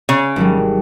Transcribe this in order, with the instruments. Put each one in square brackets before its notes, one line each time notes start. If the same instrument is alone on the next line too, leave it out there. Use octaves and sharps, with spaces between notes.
[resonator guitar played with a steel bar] C#3
[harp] G#1 F#3 G3